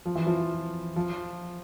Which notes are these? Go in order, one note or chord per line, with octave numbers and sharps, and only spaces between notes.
F3
E3
F3
F3